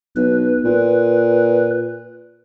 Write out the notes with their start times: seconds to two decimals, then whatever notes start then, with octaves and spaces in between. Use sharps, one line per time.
0.16 B1 B4
0.65 A#2